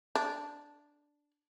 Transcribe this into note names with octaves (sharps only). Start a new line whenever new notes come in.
D4